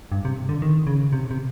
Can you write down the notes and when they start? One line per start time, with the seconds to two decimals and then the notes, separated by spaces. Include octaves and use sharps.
0.12 G2
0.25 C3
0.49 D3
0.62 D#3
0.87 C#3
1.13 C3
1.31 C3